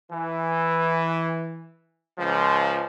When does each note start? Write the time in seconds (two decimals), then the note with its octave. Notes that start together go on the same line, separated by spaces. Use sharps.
0.12 E3
2.18 C#2 F3